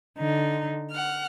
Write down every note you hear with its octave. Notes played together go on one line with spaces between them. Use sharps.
D3 D#4
F#5 F6